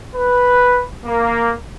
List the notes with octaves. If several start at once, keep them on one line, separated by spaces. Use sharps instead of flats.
B4
A#3